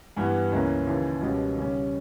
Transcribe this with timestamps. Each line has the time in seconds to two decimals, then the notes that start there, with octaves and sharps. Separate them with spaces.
0.17 G2 E3 G3 B3
0.52 C#2 C#3 E3 A#3 C#4
0.87 D#2 C#3 E3
1.21 C#2 B2 G3 C#4
1.56 D#2 C#3 G3 C#4